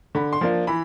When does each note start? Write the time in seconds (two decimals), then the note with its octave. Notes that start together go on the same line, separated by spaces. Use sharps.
0.15 D3 B5
0.33 C6
0.41 F3 A#3 D4
0.67 E3 B5